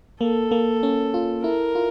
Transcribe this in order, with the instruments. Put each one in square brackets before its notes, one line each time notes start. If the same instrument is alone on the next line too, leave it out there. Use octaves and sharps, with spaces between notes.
[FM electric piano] A#3 [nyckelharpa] A4
[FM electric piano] A#3
C#4
F4
[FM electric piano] E4 [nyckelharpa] A#4
[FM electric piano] F4